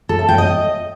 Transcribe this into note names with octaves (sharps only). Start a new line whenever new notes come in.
A4
E5
G5
D#5